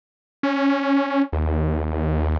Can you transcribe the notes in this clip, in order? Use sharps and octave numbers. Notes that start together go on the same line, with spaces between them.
C#4
D#2